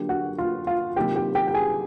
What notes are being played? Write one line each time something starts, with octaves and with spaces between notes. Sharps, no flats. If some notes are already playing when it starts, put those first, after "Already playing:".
Already playing: D3 F#3 A#3 D4 F4 G4
F#4 F#5
F4 F5
F4 F5
C3 D#3 F#3 A#3 D#4 G4 G5
G4 G5
G4 G5
G5
G#4 G#5